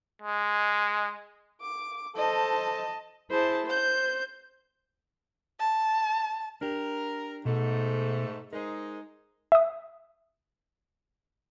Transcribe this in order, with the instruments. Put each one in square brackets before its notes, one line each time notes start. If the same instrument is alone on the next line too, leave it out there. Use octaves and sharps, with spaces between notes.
[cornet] G#3
[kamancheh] D6
[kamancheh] A4 C5 [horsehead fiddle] D#5 A5
[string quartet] E4 G#4 C5 A5
C5 G6
[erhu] A5
[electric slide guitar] D4 G4 [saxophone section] A#4
[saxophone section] G#2 A3 [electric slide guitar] B2
[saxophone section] G#3 D#4 [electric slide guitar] A#4 C5
[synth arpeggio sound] E5 D#6